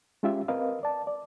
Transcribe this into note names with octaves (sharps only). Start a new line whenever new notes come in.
G#3 C#4 F4 G4 E5
C4 A#4 B4 D#5 F5
D5 A5
D5